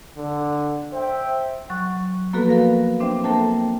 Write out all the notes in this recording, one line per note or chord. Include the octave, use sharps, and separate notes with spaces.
D3
C5 E5 G5
F#3 C#6 F#6
F3 A#3 B3 F#4 A4 B4
A#4 F5 A#6
C4 D4 C5 E5 G5
A#3 A4 A#4 C5 G5 A5